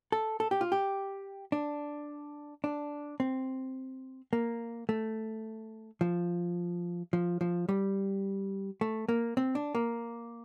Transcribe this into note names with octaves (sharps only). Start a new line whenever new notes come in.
A4
A4
G4
F4
G4
D4
D4
C4
A#3
A3
F3
F3
F3
G3
A3
A#3
C4
D4
A#3